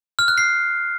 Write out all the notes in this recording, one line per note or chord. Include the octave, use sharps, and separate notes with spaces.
F6
F#6
C7